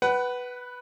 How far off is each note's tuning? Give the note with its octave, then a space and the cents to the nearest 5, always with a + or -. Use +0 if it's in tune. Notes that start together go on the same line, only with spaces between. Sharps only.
B4 +0 F#5 +25